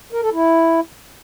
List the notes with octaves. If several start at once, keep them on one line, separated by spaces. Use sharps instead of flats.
A#4
A4
E4